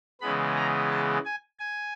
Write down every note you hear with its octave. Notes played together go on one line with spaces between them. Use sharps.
C#3 E3 G#3 B3 B5
A#5
A5
G#5
G#5